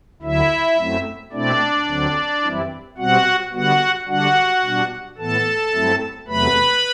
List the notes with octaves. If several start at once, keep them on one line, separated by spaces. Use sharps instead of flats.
D2 D3 F#3 E4 E5
F#2 F#3 A3 C4 E4
B2 A3 C4 D4 E4 D5
D2 D3 F#3 C4
F#2 E3 G3 C4 E4
B2 G3 C4 F#4 F#5
D3 G3 B3 F#4 F#5
D3 G3 D4 F#4 F#5
B2 G3 D4
A2 E3 B3 A4 A5
G2 F#3 A3 C4 E4
E2 C3 F#3 A3 B4 B5